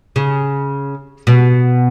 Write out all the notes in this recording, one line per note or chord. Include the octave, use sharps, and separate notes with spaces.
C#3
B2